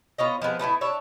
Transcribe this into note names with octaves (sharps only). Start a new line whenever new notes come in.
B3 F4 C#5 D#5
F3 G#3 B3 G#4
A3 B3 C#4 E4
D4 C#5 E5